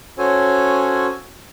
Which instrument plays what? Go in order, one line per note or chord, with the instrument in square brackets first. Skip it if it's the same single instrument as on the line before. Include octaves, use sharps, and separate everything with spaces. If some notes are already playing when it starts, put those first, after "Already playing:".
[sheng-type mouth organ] C#4 F#4 A4 C5 C#5 G#5